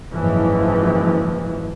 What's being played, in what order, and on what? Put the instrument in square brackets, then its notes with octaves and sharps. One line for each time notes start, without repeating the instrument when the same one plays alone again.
[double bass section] F#1 G#2 E3 F3